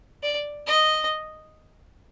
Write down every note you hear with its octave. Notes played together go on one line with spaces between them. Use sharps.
D5
D#5